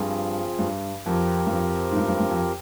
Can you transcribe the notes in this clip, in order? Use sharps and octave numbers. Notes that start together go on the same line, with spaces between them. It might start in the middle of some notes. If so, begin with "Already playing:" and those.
Already playing: G2 F3 C4 F4 G#4
G2
F2 F3 C4 G4 A#4
G2
F2
G#2
G2
G2
G2
F2